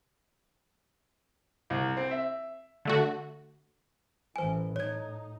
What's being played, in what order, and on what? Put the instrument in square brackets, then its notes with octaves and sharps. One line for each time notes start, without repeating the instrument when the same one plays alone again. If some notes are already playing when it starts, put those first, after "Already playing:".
[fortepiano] C2
C4
E5
[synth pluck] D3 A3 F#4
[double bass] A1 E3 [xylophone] C5 G#5
[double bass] A2 D#4 [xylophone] C#5 G#6